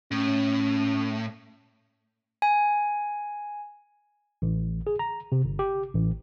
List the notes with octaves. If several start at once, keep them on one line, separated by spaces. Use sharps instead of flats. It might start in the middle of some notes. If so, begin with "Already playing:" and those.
A2 C#4
G#5
A1
G#4
A#5
C3
G1
G4
A1